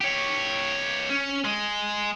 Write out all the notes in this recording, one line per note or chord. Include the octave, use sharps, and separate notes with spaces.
G4 C#5
C#4
G#3